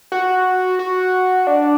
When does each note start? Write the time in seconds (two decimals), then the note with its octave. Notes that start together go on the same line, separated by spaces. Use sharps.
0.12 F#4
0.79 F#4
1.47 D4